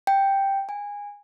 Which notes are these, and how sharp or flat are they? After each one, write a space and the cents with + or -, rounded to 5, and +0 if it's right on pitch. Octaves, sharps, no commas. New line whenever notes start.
G5 +0
G#5 -20